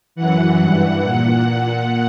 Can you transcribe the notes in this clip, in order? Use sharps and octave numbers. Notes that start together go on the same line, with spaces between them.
F#2 E3 F#5
G2 E3
A#2 F#5